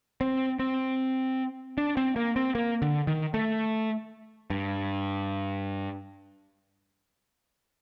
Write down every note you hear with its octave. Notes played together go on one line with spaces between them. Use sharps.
C4
C4
D4
C4
A#3
C4
A#3
D3
D#3
A3
G2